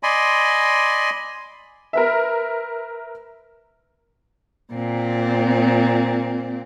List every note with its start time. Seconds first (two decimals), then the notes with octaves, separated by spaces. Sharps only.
0.03 D5 D#5 G#5 B5 C6
1.93 A#4 B4 E5
4.73 A#2 C4